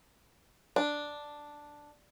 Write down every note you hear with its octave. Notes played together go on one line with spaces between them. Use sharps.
D4